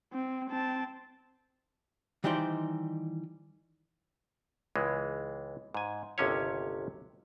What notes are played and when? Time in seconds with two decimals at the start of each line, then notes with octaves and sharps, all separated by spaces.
0.13 C4
0.50 C4 A5
2.24 D#3 E3 G3 D#4 C5 D5
4.76 C#2 E3 G#3
5.75 G#2 G#5
6.18 G1 D#2 C3 C#4 E4 C#5